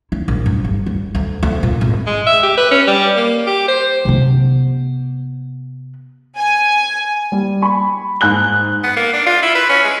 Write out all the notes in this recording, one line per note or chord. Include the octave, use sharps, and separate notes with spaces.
E4
A#1
G2
G1
G3
D2
D2
A#2
G#1
G#3
E5
G4
B4
C#4
G3
A#3
G4
C5
C3 B3
G#5
G3
G#5 B5 C#6
G#2 G#5 F#6 G7
B3
A#3
D4
F4
E4
B4
C#4
G#3